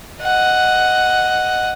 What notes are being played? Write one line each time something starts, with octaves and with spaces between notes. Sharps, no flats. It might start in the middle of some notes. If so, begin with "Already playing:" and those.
D#5 F#5